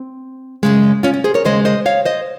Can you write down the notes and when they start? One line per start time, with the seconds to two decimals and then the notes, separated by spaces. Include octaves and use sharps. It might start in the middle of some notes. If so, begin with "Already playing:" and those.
Already playing: C4
0.63 F#2 C#3 G#3
1.03 C#4 F4
1.14 C#4
1.24 G#4 C5
1.34 A#4 C#5
1.45 D#2 C#3 G#3 C5 D#5
1.65 C5 D#5
1.86 C#5 F5
2.05 C5 D#5